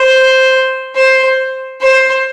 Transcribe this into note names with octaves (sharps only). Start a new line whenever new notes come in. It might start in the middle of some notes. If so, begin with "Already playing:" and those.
Already playing: C5
C5
C5